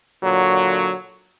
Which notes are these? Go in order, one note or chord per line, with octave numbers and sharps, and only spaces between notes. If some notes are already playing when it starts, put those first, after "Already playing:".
A#2 D3 F#3